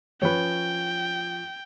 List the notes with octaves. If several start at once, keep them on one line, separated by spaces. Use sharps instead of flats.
F3 C#4 B4 C#5 G5